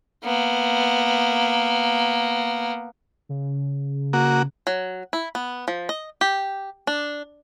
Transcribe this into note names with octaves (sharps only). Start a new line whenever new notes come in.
A#3 B3
C#3
A#3 F#4
F#3
E4
B3
F3
D#5
G4
D4